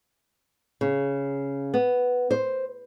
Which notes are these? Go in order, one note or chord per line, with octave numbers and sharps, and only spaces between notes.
C#3
B3
C5